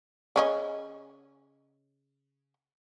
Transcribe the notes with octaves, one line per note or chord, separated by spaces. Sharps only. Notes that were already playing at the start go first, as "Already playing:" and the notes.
C#3 C#4 D#5